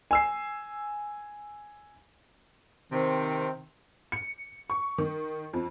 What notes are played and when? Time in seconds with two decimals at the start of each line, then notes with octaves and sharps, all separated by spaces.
0.11 G#5 E6 C7
2.92 C3 D#3 C4
4.12 C#7
4.70 C#6
4.98 D#3
5.53 F2